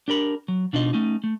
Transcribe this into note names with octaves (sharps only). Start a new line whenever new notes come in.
D4 G4 A#4 B5
F#3
B2 D4 D#4 F4 D#5
A3 C#4 D#4
A3